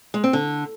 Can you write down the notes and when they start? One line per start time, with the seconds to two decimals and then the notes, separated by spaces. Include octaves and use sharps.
0.14 G#3
0.24 C4
0.33 D3